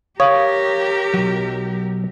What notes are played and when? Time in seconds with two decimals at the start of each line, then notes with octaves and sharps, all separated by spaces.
0.20 G4 A#4 C#5 F5 D#6
1.14 B1 F#3